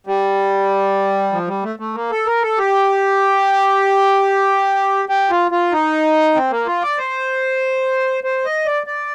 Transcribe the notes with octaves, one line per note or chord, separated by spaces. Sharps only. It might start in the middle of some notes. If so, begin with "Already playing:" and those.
G3
F3
G3
A3
A3
A#3
A4
A#4
A4
G4
G4
F4
F4
D#4
C4
A#3
F4
D5
C5
C5
D#5
D5
D5